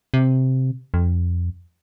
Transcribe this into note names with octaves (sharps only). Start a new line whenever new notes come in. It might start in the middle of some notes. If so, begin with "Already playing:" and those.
C3
F2